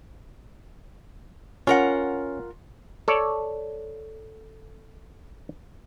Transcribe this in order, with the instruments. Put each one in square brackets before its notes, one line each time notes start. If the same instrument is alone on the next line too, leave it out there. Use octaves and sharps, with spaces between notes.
[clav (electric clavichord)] C#4 [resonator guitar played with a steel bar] F4 A#4 F#5
[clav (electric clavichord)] A4 C#5 D5